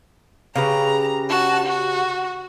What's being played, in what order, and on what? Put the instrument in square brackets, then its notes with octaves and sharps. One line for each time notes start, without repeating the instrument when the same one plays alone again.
[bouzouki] C#3 G4 B4 [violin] A#5
[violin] F#4 A5
F#4